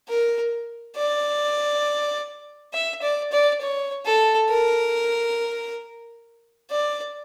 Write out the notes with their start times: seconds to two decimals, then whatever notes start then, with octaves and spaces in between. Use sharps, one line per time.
0.08 A#4
0.96 D5
2.73 E5
3.02 D5
3.32 D5
3.61 C#5
4.05 A4
4.49 A#4
6.71 D5